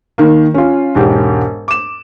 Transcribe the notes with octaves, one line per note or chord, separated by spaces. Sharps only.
D#3 A#3
C#4 F4
E1 G#2 G4
D6 E7